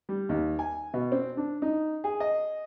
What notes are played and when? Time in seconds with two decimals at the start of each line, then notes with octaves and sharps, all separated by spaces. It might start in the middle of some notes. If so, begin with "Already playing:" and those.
0.09 G3
0.29 D#2
0.59 G#5
0.94 B2
1.12 C4
1.37 D4
1.62 D#4
2.04 G#4
2.20 D#5